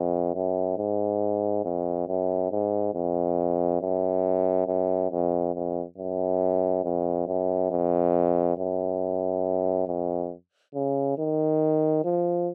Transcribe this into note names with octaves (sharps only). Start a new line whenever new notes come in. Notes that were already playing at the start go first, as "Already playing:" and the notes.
Already playing: F2
F#2
G#2
F2
F#2
G#2
F2
F#2
F#2
F2
F2
F#2
F2
F#2
F2
F#2
F2
C#3
D#3
F3